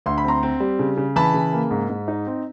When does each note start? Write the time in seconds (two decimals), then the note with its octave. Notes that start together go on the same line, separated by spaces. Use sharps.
0.06 D2 C6
0.18 B5
0.24 C4 A#5 C6
0.43 C4
0.60 G3
0.79 C#3
0.97 C#3
1.16 E3 A5 B5
1.34 C#3
1.53 A#3
1.71 G#2
1.89 G#2
2.08 D#4
2.26 C4